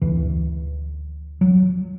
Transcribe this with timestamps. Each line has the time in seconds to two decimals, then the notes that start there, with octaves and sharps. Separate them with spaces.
0.02 D2 D3 E3
1.41 F#3